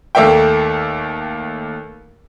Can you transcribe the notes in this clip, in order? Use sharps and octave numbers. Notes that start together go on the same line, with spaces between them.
D#2 A3 A#3 E5 G5